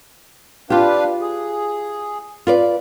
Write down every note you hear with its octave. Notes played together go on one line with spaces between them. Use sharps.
D4 F4 G4 B4 F5
G#4
F4 B4 D5